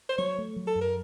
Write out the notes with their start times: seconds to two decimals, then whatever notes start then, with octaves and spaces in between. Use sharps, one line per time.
0.09 C5
0.18 F#3 C#5
0.38 A3
0.56 F#3
0.67 A4
0.75 F#2
0.81 A#4